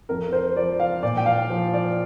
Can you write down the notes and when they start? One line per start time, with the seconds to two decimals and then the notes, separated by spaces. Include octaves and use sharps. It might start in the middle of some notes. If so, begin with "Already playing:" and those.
0.09 F2 A#4
0.32 C5
0.56 F3 D5
0.80 F5
1.03 A#2 D5
1.17 G5
1.26 F5
1.50 F3
1.73 D5